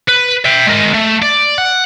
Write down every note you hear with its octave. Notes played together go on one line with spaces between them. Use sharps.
B4
E5 G5
G#3 A#4
A3
D5
F#5